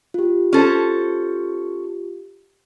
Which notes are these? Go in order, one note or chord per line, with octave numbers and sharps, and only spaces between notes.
F4 G4
C#4 A4 C5